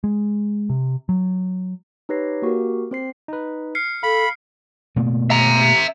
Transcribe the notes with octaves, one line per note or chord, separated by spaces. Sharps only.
G#3
C3
F#3
D#4 G4 B4 C#5 A#6 C7
A#3 F#4 G4 A#4
C4 C5 C7
D#4 B4
F6 C7 C#7
A4 F5 B5
B2 A3 A#3
E5 A#5